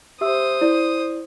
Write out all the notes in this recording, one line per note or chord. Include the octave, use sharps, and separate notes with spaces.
G4 C5 E5 D#6 E6
E4 D5